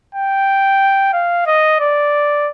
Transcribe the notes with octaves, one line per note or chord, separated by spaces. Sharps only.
G5
F5
D#5
D5